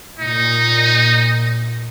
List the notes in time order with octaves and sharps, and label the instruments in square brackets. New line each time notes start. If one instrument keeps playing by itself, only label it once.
[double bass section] A#2 [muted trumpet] D#4